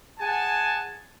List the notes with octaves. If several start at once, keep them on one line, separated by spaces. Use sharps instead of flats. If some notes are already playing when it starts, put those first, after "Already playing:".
G#4 F#5 G#5 A5